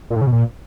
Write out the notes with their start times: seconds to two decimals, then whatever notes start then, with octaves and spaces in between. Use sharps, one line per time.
0.10 A#2
0.16 A2
0.21 C#3
0.27 B2
0.32 A#2